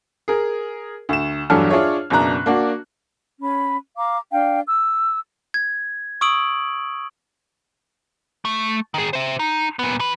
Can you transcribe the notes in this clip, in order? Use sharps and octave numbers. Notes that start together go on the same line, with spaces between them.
G#4 A#4
D2 E7
E2 G2 F#3 D4 A4 F6
D4 F4 G#4 C#5 E5
F#1 B2 D4 A#5 F#6
A#3 D4 F#4
C#4 B5
F5 A#5 D6
D4 F5 G5
E6
G#6
C#6 D#6 E6 D7 F#7
A3
D#3 G#4
C5 E5
D#4
A#2 B3
E3 B4